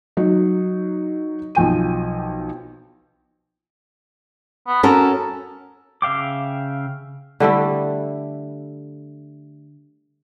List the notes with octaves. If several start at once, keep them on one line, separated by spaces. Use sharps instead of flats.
F#3 D#4 D#5
B1 F3 G5 D#7
B3
C#4 F#4 A4 A#4
C#3 E5 F5 G5 D6
D3 G3 A3 E4